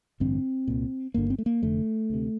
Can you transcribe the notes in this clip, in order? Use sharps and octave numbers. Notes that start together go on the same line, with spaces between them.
A1 G2 D3 C4
C2 A#2
G1 G2 D3 A#3
C4
A3
A#3
F1 F2 D3 A3
D2 C3